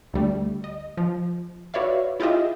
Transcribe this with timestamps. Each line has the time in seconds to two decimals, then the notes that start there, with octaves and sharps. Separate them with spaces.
0.13 D2 G3 A3
0.64 D#5
0.97 F3
1.74 F#4 B4 C#5 D5 E5 F5
2.20 E4 F4 G4 G#4 D#5 E5